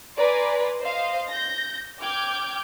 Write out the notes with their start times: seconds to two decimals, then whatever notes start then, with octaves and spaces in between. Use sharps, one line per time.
0.17 B4 D5 G#5 A#5 C6
0.81 C5 D#5 F5
1.29 G6 A#6
2.00 G5 D6 F6 G6 G#6